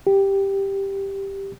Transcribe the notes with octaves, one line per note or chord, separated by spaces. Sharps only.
G4